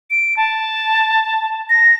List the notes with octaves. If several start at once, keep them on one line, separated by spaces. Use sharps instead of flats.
D7
A5
A#6